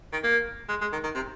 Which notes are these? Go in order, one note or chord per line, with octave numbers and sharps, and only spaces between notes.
D#3
A#3
G#3
G#3
D#3
D#3
C3